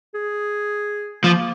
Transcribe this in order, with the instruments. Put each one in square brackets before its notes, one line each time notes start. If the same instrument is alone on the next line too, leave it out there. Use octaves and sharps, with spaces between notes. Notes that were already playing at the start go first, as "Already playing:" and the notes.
[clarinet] G#4
[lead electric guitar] F3 [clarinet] A#3